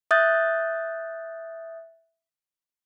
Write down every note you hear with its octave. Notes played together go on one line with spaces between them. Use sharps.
E5 D#6 F#6 G6 A6